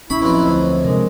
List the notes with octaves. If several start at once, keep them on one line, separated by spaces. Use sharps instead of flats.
A1 C#4 E4 B5 C#6
F2 F#3 B4 C6
D2 C5 D#5
C3 G#3 D4 A#4